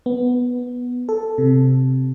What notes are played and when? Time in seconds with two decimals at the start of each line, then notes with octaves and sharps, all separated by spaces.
0.06 B3
1.09 A4
1.38 C3